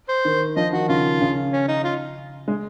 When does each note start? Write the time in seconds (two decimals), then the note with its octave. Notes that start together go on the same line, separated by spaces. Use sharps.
0.09 C5
0.25 D#3
0.57 F3 D#5
0.73 D#3 F#4
0.89 C#3 F4
1.21 C#3
1.52 C#4
1.68 D#4
1.84 F4
2.48 G#3